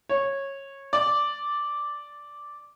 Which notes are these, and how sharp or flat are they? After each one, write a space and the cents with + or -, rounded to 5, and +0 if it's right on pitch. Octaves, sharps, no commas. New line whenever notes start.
C#5 -15
D5 -5